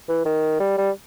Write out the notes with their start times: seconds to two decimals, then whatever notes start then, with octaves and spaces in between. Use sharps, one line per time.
0.09 E3
0.25 D#3
0.60 G3
0.78 G3